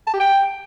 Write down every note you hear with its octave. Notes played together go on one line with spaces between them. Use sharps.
A5
G4
G5